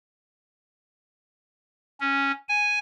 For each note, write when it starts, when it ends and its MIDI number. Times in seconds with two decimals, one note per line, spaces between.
2.00 2.32 61
2.49 2.79 80